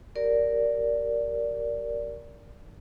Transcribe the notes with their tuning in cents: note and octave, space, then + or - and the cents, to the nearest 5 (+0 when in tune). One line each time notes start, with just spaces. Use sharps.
G4 +0 A#4 +0 D5 -10